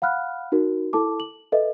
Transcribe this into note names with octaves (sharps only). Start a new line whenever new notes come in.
F5 F#5 B5 F6 F#6
D#4 F#4 A#4
E4 A4 A5 D6
F#7
A4 B4 D#5 E5